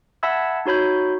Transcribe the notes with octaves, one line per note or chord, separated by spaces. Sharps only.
E5 F#5 A5 B5 E6 G#6
D#4 F#4 C#5 B5 G6